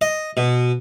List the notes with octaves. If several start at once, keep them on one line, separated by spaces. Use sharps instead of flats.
D#5
B2